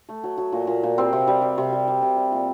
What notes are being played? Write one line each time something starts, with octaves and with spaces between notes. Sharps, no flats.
A3
F#3
F#3
A#2
A#2
A#2
G3 C4
C3
G3
G3
C3
G3
G3
C3
G3
A#2